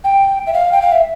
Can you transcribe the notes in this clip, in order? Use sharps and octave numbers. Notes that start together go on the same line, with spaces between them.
G5
E5
F5
G5
F5
E5